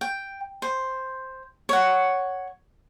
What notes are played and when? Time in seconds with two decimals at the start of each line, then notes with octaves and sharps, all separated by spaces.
0.01 G5
0.62 C5
1.69 C#5 F#5